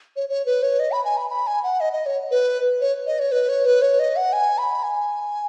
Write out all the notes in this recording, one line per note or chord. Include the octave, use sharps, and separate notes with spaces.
C#5
C#5
B4
C#5
D#5
B5
G#5
B5
B5
G#5
F#5
D#5
D#5
C#5
B4
C#5
D#5
C#5
B4
C#5
B4
C#5
D#5
F#5
G#5
B5
G#5